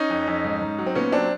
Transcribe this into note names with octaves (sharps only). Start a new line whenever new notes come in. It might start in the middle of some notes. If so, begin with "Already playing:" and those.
Already playing: C#4 D#4
F2
F2
G#2
G#2
F#3
C4
A#2 B3 C#4
F#3 C4 D4